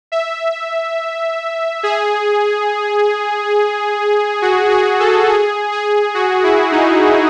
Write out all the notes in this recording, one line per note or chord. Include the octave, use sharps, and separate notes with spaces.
E5
G#4
F#4
G#4
A4
G#4
G#4
F#4
E4
D#4